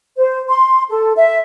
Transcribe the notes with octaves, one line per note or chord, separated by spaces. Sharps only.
C5
C6
A4
E5